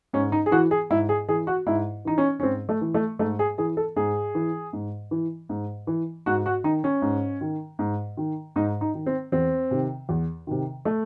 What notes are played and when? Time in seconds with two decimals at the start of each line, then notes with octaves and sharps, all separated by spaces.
0.13 G#2 C#4
0.32 D#4
0.46 G#4
0.51 E3 F#4
0.71 G#4
0.90 G#2 E4
1.09 G#4
1.28 E3 G#4
1.47 F#4
1.67 G#2 E4
2.05 E3 D#4
2.18 C#4
2.40 C#4
2.43 G#2 C4
2.69 A3
2.81 E3
2.94 A3
3.19 G#2 A3
3.39 G#4
3.58 E3 G#4
3.77 A4
3.96 G#2 G#4
4.35 E3
4.73 G#2
5.11 E3
5.49 G#2
5.87 E3
6.26 G#2 F#4
6.46 F#4
6.64 D#3 D#4
6.84 C#4
7.02 G#2
7.41 D#3
7.79 G#2
8.17 D#3
8.56 G#2 D#4
8.81 D#4
8.94 D#3
9.06 C4
9.32 E2 C4
9.71 C3 D#3
10.09 E2
10.47 C3 D#3
10.85 A3